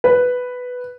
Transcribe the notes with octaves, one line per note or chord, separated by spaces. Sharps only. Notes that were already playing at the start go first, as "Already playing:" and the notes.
B4